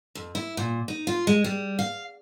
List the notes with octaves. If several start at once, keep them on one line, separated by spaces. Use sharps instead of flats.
F2
E4
A#2
D#4
F4
G#3
G3
F5